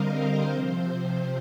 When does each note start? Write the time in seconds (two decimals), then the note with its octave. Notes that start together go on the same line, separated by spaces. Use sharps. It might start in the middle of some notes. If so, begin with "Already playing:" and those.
Already playing: D3 G3 C4 A#4 D#5 F5
0.09 C5
0.50 C3 F3 C4 C5
0.92 C5